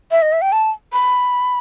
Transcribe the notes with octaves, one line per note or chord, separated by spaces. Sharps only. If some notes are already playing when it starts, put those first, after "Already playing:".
E5
D#5
E5
G5
A5
B5